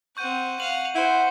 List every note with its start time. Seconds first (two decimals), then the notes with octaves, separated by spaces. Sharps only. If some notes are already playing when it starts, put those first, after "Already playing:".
0.17 C4 F#5 C#6 G6 D#7
0.60 F5 F#5 F#7
0.95 E4 C5 F#5